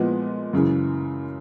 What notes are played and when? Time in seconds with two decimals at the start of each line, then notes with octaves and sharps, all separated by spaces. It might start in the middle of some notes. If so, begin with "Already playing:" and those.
Already playing: A#2 F3 G#3 B3 E4
0.53 F#2 C#3 E3